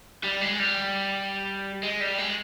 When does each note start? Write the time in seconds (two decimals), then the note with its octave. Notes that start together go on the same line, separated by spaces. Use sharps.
0.24 G3
0.41 G#3
0.59 G3
1.83 G#3
2.00 G3
2.18 G#3